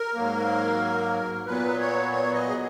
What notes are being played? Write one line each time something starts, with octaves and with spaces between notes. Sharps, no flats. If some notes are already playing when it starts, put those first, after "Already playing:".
Already playing: A#4
G#2 F#3 A#3
A#2 F#3 B3 B4
C#5
C#5
D#5
G#4